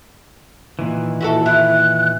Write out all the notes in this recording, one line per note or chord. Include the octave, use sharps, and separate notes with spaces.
A#2 D#3 E3
E4 F#4 A4
E4 F#6